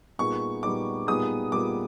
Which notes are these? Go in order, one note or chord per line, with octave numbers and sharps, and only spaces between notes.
A#2 G3 B3 D#4 G#4 C#6
A#2 G3 B3 D#4 G#4 D6
A#2 G3 B3 D#4 G#4 D#6
A#2 G3 B3 D#4 G#4 D6